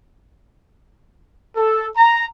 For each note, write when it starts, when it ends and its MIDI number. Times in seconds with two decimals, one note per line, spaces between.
1.57 1.87 69
1.97 2.26 82